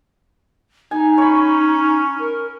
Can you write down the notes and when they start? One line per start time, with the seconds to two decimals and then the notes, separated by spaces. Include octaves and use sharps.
0.91 D#4 G#5
1.18 C#4 C#5 B5
2.19 A#4